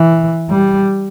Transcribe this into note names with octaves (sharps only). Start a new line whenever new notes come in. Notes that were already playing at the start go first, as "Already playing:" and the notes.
Already playing: E3
G3